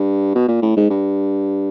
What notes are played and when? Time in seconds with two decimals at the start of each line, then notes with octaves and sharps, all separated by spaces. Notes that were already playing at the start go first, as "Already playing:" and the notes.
Already playing: G2
0.35 B2
0.49 A#2
0.62 A2
0.77 G#2
0.90 G2